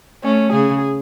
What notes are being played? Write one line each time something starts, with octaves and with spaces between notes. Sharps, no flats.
A3 C#4
C#3 G#4